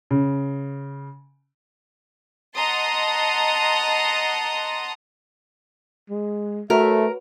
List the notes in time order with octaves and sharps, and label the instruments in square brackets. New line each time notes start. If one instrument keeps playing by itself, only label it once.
[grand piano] C#3
[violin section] D#5 F#5 A5 A#5 C6 D#6
[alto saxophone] G#3
[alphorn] A3 [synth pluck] F#4 B4 C#5 [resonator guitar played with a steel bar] A#4 [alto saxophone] E5